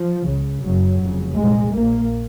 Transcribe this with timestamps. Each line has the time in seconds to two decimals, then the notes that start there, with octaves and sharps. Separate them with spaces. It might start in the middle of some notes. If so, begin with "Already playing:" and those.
Already playing: F3
0.24 C#2 C#3
0.62 F#1 F#2 C#3 F#3
1.00 F1 F2 C#3
1.37 C2 A#2 G#3
1.76 A#1 A#2 A#3